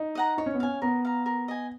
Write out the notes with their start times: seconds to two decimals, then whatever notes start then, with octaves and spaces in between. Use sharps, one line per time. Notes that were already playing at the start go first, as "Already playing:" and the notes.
Already playing: D#4
0.15 D#5 F#5 A#5
0.38 D#4 C#5
0.46 C#4
0.54 B3
0.60 C#4 F5 G#5
0.82 B3 A#4
1.05 F5 A#5
1.26 A#4
1.48 D#5 G#5